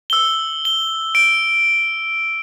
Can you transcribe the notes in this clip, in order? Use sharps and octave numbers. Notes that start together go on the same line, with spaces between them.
E6 G7
G7
D7